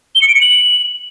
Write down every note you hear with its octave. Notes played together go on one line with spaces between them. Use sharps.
G7
C#7
D7
C#7
F#7